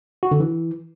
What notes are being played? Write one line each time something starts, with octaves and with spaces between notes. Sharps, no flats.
F#4
D3
E3